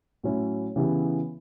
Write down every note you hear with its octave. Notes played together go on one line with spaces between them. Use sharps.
A2 F#3 C#4 E4
C#3 E3 B3 E4 G4